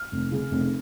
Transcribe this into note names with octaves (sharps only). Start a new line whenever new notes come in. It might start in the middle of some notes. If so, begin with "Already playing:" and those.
Already playing: F6
F1
C#3
F1